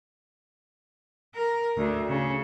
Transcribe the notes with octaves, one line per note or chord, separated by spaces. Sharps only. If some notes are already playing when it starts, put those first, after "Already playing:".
A#4
D2
C#3